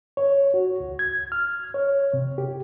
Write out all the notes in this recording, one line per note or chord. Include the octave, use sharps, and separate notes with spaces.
C#5
F#4
C#2
G#6
F6
C#5
C3
G4